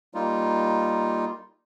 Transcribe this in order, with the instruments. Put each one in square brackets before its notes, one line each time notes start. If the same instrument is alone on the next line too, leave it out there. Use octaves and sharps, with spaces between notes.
[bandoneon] G3 A#3 D#4 F4